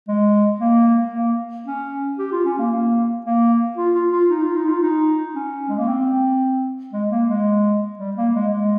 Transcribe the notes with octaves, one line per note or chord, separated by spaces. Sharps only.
G#3
A#3
A#3
C#4
G4
F4
C#4
A#3
A#3
A#3
F4
F4
F4
D#4
F4
D#4
F4
D#4
C#4
G#3
A#3
C4
G#3
A#3
G#3
G3
A#3
G#3
G#3